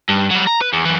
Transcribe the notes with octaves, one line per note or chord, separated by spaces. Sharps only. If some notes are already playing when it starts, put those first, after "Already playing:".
G2
F#3 G3
A#5
B4
E2
F#2 E3